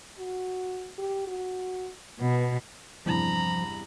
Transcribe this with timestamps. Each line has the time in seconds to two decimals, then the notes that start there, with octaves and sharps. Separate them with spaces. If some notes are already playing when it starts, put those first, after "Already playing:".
0.18 F#4
0.98 G4
1.27 F#4
2.20 B2 B3
3.06 E2 G2 C3 F3 A#5 B5